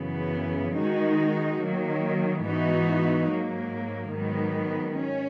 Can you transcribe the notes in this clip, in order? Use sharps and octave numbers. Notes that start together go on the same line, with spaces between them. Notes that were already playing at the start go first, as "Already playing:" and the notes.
Already playing: F#2 C#3 E3 B3
D#3 G#3 D#4 F#4
D#3 F#3 A#3
G#2 E3 B3 D#4 F#4
G#2 F#3 A#3
G#2 D#3 F#3 B3
C#4